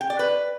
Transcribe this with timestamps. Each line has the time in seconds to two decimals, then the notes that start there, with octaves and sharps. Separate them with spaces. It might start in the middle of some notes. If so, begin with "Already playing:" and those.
0.01 G5
0.10 D5
0.19 B4